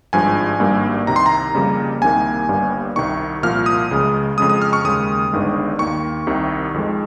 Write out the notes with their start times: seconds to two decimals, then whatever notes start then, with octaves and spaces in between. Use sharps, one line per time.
0.13 G#1 G2 F3 G#3 G#5
0.59 G#1 G2 G3 A#3
1.07 C2 C3 D#3 A#5
1.16 C6
1.26 A#5
1.54 F2 C#3 G3 A#3
2.02 C2 C3 D#3 A#3 G#5
2.49 G1 G2 G3 A#3
2.96 C2 C3 D#3 C#6
3.43 C2 A#2 F3 A#3 F6
3.66 D#6
3.91 C#2 C#3 G#3
4.37 F2 C#3 G#3 D#6
4.50 D#6
4.62 F6
4.73 C#6
4.84 D#2 C#3 G#3 D#6
5.32 G1 G2 D#3 G#3
5.79 D#2 D#3 A#3 C#6
6.27 C2 C3 D#3
6.74 F2 D#3 G#3